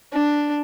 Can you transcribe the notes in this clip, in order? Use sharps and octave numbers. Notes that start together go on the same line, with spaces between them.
D4